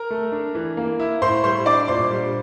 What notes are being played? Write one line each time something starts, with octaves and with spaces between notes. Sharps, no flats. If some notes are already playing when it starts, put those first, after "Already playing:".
Already playing: A#4 A#5
A3
D4
E3
A#3
E4
A2 C5 C6
G3 C5 C6
D4 D5 D6
A#2 C5 C6
G3